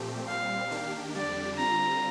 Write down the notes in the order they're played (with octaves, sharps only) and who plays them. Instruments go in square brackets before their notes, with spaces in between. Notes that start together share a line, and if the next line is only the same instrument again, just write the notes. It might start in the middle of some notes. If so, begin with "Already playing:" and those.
Already playing: [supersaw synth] A#2 F3 A3 C4 G4
[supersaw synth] A#2 G3 C4 [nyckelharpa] F5
[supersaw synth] D#3 A#3 D4 G4
[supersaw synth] F2 D3 G3 D4 G4 [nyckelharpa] D5
[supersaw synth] D3 G3 C4 F4 [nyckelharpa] A#5